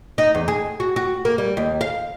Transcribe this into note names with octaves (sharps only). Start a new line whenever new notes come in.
D#4
E2
G#4
F#4
F#4
A#3
G3
D#2
F5